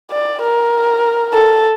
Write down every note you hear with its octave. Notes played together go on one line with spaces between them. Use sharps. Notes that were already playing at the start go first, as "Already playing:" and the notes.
D5
A#4
A4